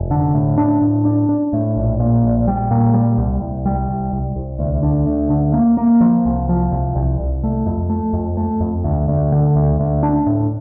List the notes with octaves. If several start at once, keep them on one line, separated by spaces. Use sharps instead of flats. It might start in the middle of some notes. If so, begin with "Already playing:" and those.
Already playing: F1
D3
A2
D4
A2
D4
D4
A2
A#1
A#2
A#1
G3
A#2
G3
C2
C2
G3
C2
C2
C2
D2
D3
D2
D3
A#3
A#3
F3
C2
F3
C2
C2
C2
A3
F2
A3
F2
A3
F2
D2
D2
D3
D2
D2
D4
A2